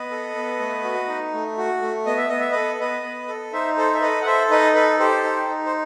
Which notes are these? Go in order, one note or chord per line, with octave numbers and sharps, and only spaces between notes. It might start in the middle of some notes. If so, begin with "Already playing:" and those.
Already playing: B3 B4 D#5
A4
B3
A3
F#4
D#4
A3
F#4
A3
B3 D#5
E5
B3 D#5
E5
A4 B4 D#5
B3 B4 D#5
B3
A4
D#4 C5 E5
A4 C5
E5
A4 B4 D#5
F#5
A4 C5 E5
D#4 B4 D#5
A4 B4
G4 A4 C5
D#4
D#4
C5